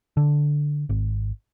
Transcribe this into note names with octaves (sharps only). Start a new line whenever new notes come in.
D3
G#1